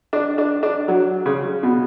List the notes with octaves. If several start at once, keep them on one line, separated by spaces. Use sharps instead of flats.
D4
D4
D4
F#3
C#3
B2